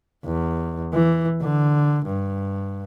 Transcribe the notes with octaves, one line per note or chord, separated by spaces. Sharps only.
E2
E3
D3
G2